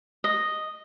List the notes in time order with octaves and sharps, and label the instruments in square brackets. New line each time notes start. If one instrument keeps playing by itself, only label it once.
[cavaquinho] D#5